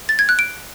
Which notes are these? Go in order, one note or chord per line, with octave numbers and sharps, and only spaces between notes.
A6
G#6
F#6
D7